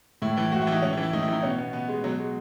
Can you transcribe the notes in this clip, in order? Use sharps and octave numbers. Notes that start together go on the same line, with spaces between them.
A2 E4
E3 E4
A2 F#4
E4
E3
D#4
A2 C#4
E4
E3
E4
A2 D#4
E4
E3 D#4
B2 C#4
B3
B2 B3
G#3
B2 F#3
G#3